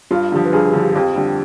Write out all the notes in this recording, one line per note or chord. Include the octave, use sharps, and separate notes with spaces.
G2 F4
D3 F3 G4
B4
G2 G#4
G4
D3 F3
G4
G#4
F2 G4
D3 G3